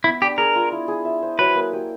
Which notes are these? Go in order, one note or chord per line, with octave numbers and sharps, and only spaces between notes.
B3 E4
D4 G4
G#4 A#4
F4
E4
G#4
E5
C5
F#3 B4
A#3
G4